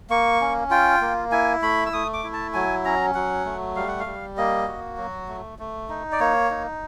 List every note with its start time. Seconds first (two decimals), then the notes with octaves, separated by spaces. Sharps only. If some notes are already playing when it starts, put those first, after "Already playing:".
0.10 A#3 C#6
0.41 C#4
0.71 F4 G5
1.01 A#3
1.31 E4 G#5
1.62 A3 B5
1.86 E6
1.93 A3 D#6
2.13 D6
2.24 E4
2.33 A5
2.54 F#3 G#5
2.85 C#4 A#5
3.15 F#3 F#5
3.45 A3
3.76 G3 F5
3.88 F#5
4.00 F5
4.06 G3
4.37 A#3 D#5
4.68 F#4
4.98 F#3
5.28 A3
5.59 A3
5.89 D#4
6.12 D5
6.20 A#3 C#5
6.50 D#4